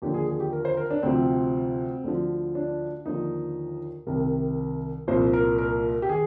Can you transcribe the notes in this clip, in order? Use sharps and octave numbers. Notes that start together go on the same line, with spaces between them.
D#2 D3 F3 G4
G#4
G#4
G4
A#4
C5
A#4
D4
D2 C3 F3 C4
D2 D3 F3
D4
D#2 D3 F3 D#4
C2 C3 D#3 A#4
C2 A#2 F3 C5
A#4
A#4
G4
D#3 G#4